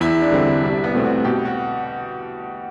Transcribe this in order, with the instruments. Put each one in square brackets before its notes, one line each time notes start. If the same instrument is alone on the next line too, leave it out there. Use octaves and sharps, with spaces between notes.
[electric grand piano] E2 [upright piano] E4
[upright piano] D4
[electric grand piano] D3 G3 C4 E4
[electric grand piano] C2 [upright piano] G3
[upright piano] B3
[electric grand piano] B2 A3 C4
[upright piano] F#4
[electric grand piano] B2 [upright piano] G4
[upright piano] F#4